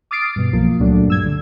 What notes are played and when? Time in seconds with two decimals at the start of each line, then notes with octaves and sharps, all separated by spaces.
0.11 D6 D#6 F6 A6 C7 D7
0.36 G2 B2
0.53 B1 F3 A#3
0.79 C#2 A#2 F#3 A3 D4
1.08 G2 E6 G#6
1.26 D3